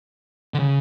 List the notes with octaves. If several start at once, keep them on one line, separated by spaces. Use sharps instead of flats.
D3
C#3